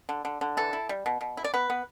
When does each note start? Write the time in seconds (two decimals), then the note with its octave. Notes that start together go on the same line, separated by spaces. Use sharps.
0.09 D3
0.25 D3
0.41 D3
0.57 E3 A4
0.73 E4
0.89 G3
1.06 B2
1.21 B2
1.37 E4
1.44 D5
1.54 B3 B4
1.70 B3